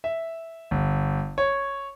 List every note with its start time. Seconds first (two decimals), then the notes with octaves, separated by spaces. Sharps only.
0.04 E5
0.71 G1
1.38 C#5